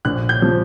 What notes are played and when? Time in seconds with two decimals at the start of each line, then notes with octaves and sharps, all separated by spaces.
0.05 A#1 F#6
0.29 G6
0.42 F3